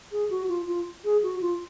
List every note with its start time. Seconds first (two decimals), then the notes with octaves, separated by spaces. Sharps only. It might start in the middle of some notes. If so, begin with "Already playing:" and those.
0.12 G#4
0.30 F#4
0.49 F4
0.68 F4
1.05 G#4
1.23 F#4
1.41 F4